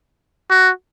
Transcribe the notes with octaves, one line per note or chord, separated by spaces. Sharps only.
F#4